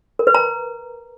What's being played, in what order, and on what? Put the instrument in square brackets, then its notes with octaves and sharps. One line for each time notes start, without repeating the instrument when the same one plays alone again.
[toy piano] A#4
B4
A#5